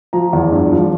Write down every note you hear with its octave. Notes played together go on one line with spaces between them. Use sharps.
F3 A#5
E2
G2
F3